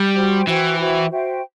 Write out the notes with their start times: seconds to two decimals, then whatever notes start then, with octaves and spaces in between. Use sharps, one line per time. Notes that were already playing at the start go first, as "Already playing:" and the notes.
Already playing: G3
0.15 F#4 C5 G5
0.47 E3 F#4 C5 G5
0.78 F#4 C5 E5 G5
1.10 F#4 C5 E5 G5